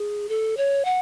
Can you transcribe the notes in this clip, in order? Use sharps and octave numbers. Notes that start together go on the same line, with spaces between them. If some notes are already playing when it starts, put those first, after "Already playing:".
Already playing: G#4
A4
C#5
F#5